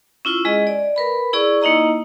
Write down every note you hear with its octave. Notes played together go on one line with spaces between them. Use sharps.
C#4 E4 F4 C#6
G#3 G#4 D#5
D5
A#4 B4 B5
E4 G#4 D5 C#6
A#3 D#4 E4 D#5 A#5